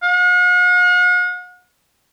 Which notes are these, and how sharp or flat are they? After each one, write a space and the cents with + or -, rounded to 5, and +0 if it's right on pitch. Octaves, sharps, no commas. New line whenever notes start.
F#5 -45